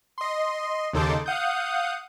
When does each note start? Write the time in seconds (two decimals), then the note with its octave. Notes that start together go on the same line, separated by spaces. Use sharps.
0.18 D#5 C6
0.93 D#2 C#3 D#4 A4 C6 D6
1.26 F5 F#5 D#6 G6